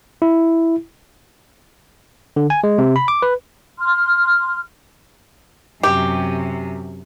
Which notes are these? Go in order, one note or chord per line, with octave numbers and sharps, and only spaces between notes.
E4
D3
G#5
G#3
C3
B5
D6
B4
C6 F6
F#2 C3 G4